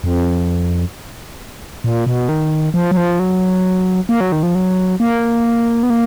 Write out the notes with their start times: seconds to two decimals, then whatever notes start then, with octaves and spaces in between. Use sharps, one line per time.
0.04 F2
1.84 A#2
2.06 B2
2.29 D#3
2.74 F3
2.91 F#3
2.97 F3
3.19 F#3
4.09 A#3
4.21 F#3
4.32 D#3
4.43 F3
4.55 F#3
5.00 A#3
5.83 B3
5.90 A#3